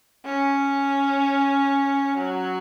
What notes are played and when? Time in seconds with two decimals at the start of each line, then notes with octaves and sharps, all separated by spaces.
0.25 C#4
2.18 F#3